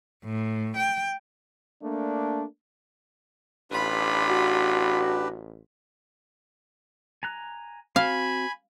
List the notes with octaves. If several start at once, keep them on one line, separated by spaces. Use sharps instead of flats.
A2
G5
A3 A#3 D4
A1 D4 F4 G4 B4 B5
F#4
G#5 A#5 F#6
C4 F#4 F5 G#5 B5